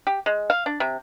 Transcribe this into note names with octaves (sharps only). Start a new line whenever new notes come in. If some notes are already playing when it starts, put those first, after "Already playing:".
G4
G#3
F5
D4
C3